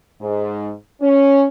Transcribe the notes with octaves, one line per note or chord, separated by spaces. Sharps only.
G#2
C#4